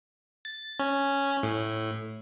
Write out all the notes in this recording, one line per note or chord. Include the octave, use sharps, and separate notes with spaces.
A6
C#4
A2